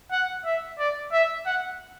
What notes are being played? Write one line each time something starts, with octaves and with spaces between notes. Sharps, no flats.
F#5
E5
D5
E5
F#5